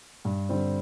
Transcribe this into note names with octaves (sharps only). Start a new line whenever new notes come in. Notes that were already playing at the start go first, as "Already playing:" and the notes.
G2
D3 G3 C4